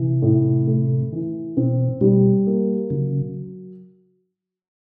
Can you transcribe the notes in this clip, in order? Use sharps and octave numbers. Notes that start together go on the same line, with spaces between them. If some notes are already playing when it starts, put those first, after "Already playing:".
Already playing: C3 E3
A2
A3
E3
B2 C4
B2 G3
A#3
C#3 F#3